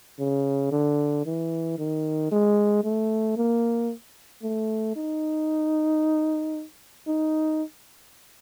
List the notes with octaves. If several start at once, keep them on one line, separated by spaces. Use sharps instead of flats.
C#3
D3
E3
D#3
G#3
A3
A#3
A3
D#4
D#4